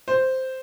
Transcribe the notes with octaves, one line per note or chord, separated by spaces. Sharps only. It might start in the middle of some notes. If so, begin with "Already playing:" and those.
C5